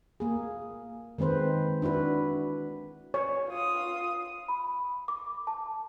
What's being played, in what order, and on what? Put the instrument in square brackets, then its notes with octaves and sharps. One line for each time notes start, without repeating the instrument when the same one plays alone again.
[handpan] A#3 G#4
D#3 G#3 C4 B4 C5
D4 E4 F#4 B4
[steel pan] C#5
[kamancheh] F4 D#6
[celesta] B5
D6
A5